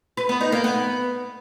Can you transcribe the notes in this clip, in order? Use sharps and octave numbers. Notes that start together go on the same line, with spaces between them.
B4
B3
D#4
A#3
B3